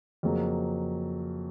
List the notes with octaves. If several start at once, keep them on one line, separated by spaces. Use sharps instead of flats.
F2 C#3 F#3 A#3